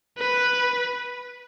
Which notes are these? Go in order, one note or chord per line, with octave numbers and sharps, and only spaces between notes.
B4